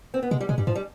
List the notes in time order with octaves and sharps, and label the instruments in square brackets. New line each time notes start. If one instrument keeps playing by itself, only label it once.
[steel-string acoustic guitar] C4
B3
[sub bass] C3 [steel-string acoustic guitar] G#3
[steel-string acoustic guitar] G3
[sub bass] B2 [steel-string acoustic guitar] G#3
[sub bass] G2 [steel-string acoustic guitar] G3
[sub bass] G#2 [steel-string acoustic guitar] F3
[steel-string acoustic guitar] G3